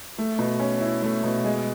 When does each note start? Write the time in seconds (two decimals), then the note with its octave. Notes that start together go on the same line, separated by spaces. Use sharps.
0.18 A3
0.39 B2
0.60 C#4
0.81 E4
1.03 A3
1.24 B2
1.44 G#3